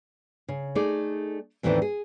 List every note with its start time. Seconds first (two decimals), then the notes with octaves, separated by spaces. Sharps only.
0.48 C#3
0.75 A3 D#4 G#4 D5
1.63 E2 A2 D#3 E3 C4 D4
1.82 G#4